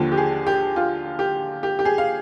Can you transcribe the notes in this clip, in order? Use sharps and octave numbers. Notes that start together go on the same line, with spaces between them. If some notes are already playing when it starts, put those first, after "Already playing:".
Already playing: D#2 D3 F3
G4
G#4
G4
F4
G4
G4
G4
G#4
F5